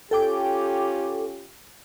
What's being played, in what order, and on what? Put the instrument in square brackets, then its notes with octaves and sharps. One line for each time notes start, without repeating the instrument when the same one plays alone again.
[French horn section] C#4 F4 G4 [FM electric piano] A4 G5 D6